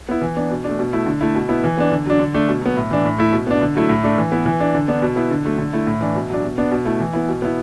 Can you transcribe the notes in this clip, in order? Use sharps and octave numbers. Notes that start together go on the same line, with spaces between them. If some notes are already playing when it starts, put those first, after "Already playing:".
B3 E4
E3
B3 D4
B2
A3 D4
B2
A3 E4
D3
A3 E4
B2
B3 E4
E3
B3 D4
D3
F#3 D4
D3
A3 D4
B2
F#3 B3
A2
E3 D4
A2
A3 E4
B2
B3 D4
D3
F#3 A3 E4
A2
A3 D4
E3
B3 E4
E3
D4
D3
B3 D4
B2
B3 E4
D3
F#3 A3
D3
A3 E4
A2
E3 D4
B2
F#3 D4
B2
B3 D4
B2
A3 E4
E3
B3 E4
B2
B3 E4